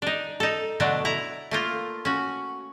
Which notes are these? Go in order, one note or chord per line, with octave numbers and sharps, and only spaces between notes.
D4 D#4
D#4 A4
B2 D3 F#3 A3 D4
E4 A#5
A3 A#3 F4
C#4 F#4